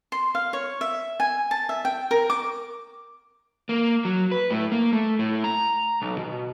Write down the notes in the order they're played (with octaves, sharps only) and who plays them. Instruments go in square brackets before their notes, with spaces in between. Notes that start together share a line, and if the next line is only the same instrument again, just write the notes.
[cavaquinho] C6
F5
C#5
E5
G#5
A5
E5
G5
A#4
D6
[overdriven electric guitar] A#3
F#3
B4
A2
A#3
A3
A2
A#5
B1
B2